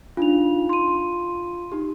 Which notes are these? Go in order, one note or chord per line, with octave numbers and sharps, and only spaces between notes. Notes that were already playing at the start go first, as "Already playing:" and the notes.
D4 D#4 F4 F7
C6 D#7
D#4 G4